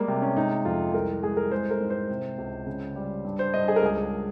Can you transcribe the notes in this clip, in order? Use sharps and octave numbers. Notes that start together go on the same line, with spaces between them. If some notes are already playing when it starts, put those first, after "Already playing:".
Already playing: G3 G#3 A#3
C3
C#4
G#3 D#4
F2 F4
C2 A#4
G#3 G#4
A#4
G#3 C5
A#4
G#2
C5
C3
C#2
C#3
G3
G2
C5
G2 D#5
G#4
A#4
C#2 G#4